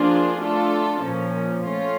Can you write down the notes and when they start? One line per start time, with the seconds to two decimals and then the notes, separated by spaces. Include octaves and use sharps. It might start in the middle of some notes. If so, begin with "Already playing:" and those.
Already playing: F3 A#3 D4 F4 G#4
0.39 A3 D4 F4 A4
1.01 A#2 F3 A#3 C#4
1.64 A3 C#4 F4